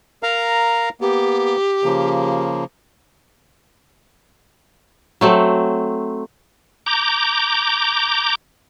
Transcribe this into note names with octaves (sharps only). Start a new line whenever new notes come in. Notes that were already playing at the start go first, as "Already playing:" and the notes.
A#4 F5 A#5
A#3 B3 G4
C#3 F3 A#3
F#3 A3 C4
A#5 D6 G6